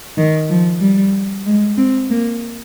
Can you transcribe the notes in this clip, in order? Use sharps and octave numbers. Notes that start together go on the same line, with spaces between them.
D#3
F3
G3
G#3
C4
A#3